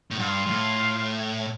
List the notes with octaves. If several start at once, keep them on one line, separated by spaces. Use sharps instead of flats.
A2
G2 F4 F5
G2
A2